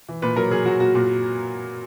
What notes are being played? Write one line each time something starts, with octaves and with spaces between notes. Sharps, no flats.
E3
A#2 B4
F#3 A#4
F#3 G#4
F#3 F#4
A#2 F#4
A#2